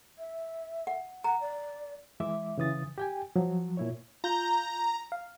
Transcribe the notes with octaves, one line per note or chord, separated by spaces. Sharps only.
E5
F#5
F#5 A#5
D5
E3 G#3 E5 D6
C#3 E3 D#6 A6
G4 G5 G#5
F3 F#3
A#2 E4 C#5
F4 A#5 G6
F5